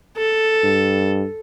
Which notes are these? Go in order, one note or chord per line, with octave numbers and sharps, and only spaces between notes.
A4
G2